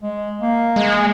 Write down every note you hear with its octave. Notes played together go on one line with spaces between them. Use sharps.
G#3
A#3
G#3